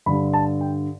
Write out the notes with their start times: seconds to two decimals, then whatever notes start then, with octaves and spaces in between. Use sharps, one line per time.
0.06 G2 D3 G3 B5
0.33 A5
0.61 G5